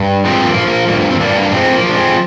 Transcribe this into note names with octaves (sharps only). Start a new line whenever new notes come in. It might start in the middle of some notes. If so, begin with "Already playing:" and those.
Already playing: G2
F3 G#3 C4
A#3
F3
A#3
G2 A#3
A#3
C4
G2 A#3 D4
A#3
D4
F3 G#3 C4
A#3
F3
D4
G#3 C4